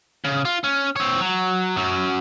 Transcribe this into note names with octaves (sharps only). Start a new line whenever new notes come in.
C#3
F4
C#4
C4 C#5
F#3
F#2 F#3